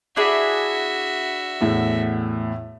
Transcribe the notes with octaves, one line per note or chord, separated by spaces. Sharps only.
D4 E4 F#4 G#4 E5
E2 A2